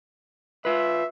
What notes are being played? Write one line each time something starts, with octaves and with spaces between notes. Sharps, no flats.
F4 B4 E5